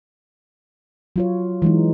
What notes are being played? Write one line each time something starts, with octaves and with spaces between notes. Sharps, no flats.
F#3 F4 C#5
E3 G#3 D#4